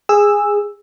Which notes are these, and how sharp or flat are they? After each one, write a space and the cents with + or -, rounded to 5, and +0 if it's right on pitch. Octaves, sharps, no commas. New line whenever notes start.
G#4 -15 E6 +0